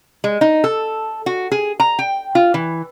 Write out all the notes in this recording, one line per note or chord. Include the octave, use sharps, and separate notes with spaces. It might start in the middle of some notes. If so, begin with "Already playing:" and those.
G#3
D#4
A4
F#4
G#4
A#5
G5
F4
E3